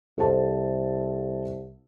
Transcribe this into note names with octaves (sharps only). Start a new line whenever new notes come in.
C2 A4 C5 A5